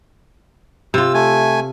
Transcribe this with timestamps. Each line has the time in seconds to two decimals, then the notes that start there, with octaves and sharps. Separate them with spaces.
0.94 C3 F4 E6
1.14 A3 G#5